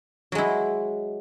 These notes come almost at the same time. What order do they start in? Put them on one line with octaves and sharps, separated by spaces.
F#3 G#3 E4